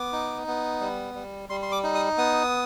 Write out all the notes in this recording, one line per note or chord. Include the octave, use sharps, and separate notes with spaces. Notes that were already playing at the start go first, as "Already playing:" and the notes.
Already playing: B3 D6
D#4
B3
G3
G3
G3 C6
C6
D6
D#4
D#6
B3 D#6